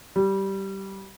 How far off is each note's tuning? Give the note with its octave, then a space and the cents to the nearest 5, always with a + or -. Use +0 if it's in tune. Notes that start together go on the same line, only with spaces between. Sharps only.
G3 -15